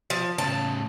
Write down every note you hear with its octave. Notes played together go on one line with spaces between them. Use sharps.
F3
A2 C#3 A5